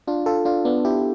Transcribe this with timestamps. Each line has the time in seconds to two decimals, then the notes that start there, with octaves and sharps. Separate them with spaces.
0.07 D4 F4
0.26 F4 A4
0.45 D4 F4
0.65 B3 D4
0.85 E4 G4